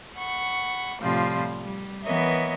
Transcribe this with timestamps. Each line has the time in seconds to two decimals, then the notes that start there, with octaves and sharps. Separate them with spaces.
0.16 F#5 B5 C#6
1.01 A2 C3 F3 G3 F4
1.60 G3
2.04 E3 B3 A#4 C#5 D#5 E5